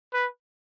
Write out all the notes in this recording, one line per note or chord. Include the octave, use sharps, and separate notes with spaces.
B4